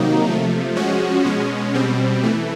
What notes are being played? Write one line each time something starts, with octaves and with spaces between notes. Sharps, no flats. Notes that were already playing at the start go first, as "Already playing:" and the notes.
Already playing: C3 D#3 F#3 A#3 D#4
C3 F3 A3
F3 G#3 C#4 F#4
B2 G#3 C#4
B2 G3 C4
E3 A3